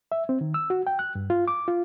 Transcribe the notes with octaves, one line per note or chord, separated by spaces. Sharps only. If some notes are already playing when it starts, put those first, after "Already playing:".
E5
C4
D#3
E6
F#4
G5
F#6
G2
F4
D6
F4